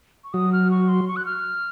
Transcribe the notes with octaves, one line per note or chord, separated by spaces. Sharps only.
C#6
F#3 D#6
F6
C#6
C6
C#6
F#6
F6